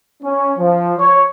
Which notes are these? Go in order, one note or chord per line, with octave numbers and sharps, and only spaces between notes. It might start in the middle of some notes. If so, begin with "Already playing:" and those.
C#4
F3
C#5